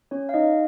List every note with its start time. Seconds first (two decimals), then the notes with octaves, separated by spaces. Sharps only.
0.11 C#4 C#5
0.29 F5
0.34 D#4 D#5